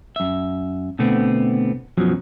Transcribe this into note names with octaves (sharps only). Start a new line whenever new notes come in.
F#2 E5
B2 D3 A3 B3 C4
F#2 B2 F3 F#3